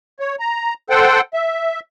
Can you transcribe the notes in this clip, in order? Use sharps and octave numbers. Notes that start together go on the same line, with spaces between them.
C#5
A#5
A4 C5 F#5 G5
E5